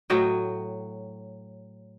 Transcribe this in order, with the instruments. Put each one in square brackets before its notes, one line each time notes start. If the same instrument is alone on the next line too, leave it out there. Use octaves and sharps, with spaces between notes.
[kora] A2 F#3 D#5 G5